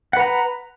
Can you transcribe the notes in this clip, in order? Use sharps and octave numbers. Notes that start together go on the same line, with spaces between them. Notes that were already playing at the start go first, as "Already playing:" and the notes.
B4 F#5 A#5